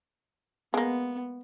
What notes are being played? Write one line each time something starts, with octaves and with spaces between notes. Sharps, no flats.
G#3 A#3 B3